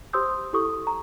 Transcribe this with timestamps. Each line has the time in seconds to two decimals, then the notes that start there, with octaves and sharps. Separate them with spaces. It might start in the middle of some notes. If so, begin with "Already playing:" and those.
0.13 G4 C5 C6 D#6 E6 G6
0.53 E4 G4 A4 C#6 D#6
0.87 A#5